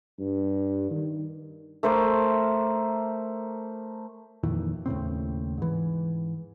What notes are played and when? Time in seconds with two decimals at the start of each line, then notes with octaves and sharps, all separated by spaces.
0.19 G2
0.90 D#3
1.83 A3 A#4 C5 D6
4.43 F2 A#2 D#3 E3
4.86 D#2 A2 C#3 C4
5.57 G#2 E3